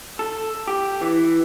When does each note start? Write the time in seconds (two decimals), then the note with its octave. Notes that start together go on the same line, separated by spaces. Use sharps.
0.19 A4
0.67 G4
1.01 E3